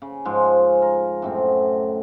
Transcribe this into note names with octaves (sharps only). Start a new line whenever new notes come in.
C#3
G#2 F3 G#3 F4
A#4
F#2 A2 C4